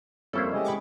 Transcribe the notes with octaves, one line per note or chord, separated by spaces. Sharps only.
F2 G3 A#3 C#4 E4 A4 C5
C#3 G#3 G4 D#5
B5 C#6 D6